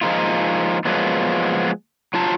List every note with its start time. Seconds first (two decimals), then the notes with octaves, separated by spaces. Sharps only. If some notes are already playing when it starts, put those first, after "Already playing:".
0.01 F3 G#3 A#3 D#4 F4
0.85 F3 F#3 G#3 A#3 B3
2.14 F#3 F4 A5 A#5